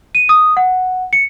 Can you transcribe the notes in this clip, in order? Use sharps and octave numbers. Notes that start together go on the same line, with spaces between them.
D#7
D#6
F#5
C#7